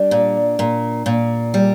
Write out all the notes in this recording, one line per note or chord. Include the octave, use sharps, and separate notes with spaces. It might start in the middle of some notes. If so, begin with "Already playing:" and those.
Already playing: G3 D4
A#2
A#2
A#2
G3